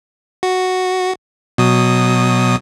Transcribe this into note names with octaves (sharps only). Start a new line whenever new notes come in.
F#4
B2 F#3 D#6